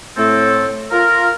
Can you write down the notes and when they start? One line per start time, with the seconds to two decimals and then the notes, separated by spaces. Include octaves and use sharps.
0.16 A2 A3 C4 A4
0.91 F4 A#4